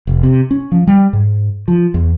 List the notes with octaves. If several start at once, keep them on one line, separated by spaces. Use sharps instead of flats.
F1
C3
C#4
F3
G3
G#2
F3
E2